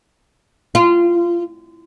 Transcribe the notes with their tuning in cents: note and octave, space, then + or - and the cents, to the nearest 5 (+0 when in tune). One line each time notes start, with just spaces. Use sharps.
F4 -20